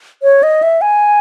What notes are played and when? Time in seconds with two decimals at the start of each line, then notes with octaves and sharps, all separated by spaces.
0.23 C#5
0.43 D#5
0.63 E5
0.81 G#5